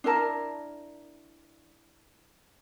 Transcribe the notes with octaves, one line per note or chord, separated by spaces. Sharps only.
D4 E4 A#4 A5